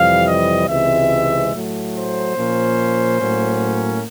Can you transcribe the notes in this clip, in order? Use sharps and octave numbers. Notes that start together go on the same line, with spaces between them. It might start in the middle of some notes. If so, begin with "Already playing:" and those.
Already playing: F2 C3 E3 G3 F5
D#5
C#2 C3 E3 G#3 C4 E5
A2 F#3 A3
C5
A#2 F3 A#3 C#4
A2 F#3 A#3 C#4